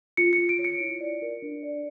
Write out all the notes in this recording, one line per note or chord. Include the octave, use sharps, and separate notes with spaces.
F4 C#7
C#7
F4
D7
C#5
C#7
E4
D5
A#4
D4
D5